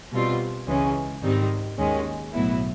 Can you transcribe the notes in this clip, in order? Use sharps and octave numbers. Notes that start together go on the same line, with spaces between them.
B2 G3 C4 F4
C#2 C#3 E3 G#3 C#4
G#2 D#3 G3 C4 D#4
D#2 D#3 G#3 C#4
B1 A2 F#3 B3 E4